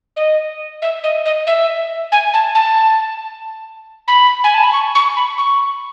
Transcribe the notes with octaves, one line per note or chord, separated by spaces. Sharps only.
D#5
E5
D#5
D#5
E5
G#5
A5
A5
B5
G#5
A5
B5
C#6
C#6
B5
C#6